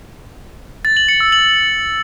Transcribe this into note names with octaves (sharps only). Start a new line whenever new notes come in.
A6
F#7
C#7
E6
F#7